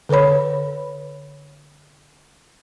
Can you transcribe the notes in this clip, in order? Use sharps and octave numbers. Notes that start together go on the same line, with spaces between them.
D3 A4 B4 C#5 B5